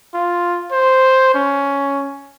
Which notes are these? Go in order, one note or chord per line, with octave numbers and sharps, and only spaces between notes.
F4
C5
C#4